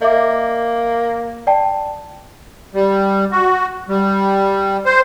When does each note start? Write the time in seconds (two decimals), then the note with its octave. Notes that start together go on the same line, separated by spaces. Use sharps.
0.02 A#3 D#5 E5 D6
1.47 D5 G5 A5
2.74 G3
3.32 F#4
3.88 G3
4.86 C5